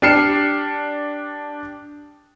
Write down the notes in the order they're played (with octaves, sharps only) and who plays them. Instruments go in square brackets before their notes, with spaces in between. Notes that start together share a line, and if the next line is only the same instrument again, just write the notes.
[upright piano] D4 G4 F6 C7 C#7 E7